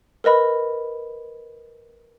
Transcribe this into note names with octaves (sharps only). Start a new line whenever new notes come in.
A#4 B4 D#5 B5